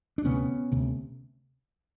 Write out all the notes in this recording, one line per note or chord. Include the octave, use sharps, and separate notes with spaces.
D4
D2 C3 B3 C#4
D2 C3